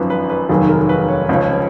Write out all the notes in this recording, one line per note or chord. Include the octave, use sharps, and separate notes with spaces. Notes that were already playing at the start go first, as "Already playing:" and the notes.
Already playing: G#1 F#2 F3 B4
B4
B4
F1 D#2 D#3 F#3 G#4
A#4
B4
C#5
C#2 C#3 F3 C#5